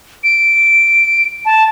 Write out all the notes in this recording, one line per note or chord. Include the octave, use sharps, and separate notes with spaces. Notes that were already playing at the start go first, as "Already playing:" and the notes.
D7
A5